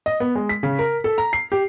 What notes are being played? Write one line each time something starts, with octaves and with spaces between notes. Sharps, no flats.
D#5
B3
G#3
B6
C#3
A#4
A4
A#5
C7
G4